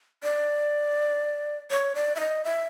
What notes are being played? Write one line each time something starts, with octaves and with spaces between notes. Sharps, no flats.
D5
C#5
D5
E5
D#5
E5